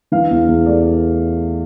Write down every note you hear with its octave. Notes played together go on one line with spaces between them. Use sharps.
E3 F5
E2
E2
A3 D5